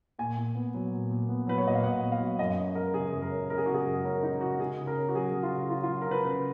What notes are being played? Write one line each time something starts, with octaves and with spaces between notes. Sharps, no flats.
A#2 G#5
A#2
B3
F#3
A#2
A#2
B3
F#3 B4
C#5
A#2 D#5
F5
A#2 F#5
B3
F5
F#3
F#2 D#5
C#4
G#3 A#4
C#3 G#4
F#2
A#4
C#4
G#3 A#4
G#4
C#3 F#4
G#4
F#2
C#4 A#4
G#3 D#4
C#3 F#4
C#3 G#4
C#3
A#4
C#4
F#4
F#3 G#4
C#3
F4
C#3
C#4 F4
F4
F#3
A#4
C#3 B4
C#3 B4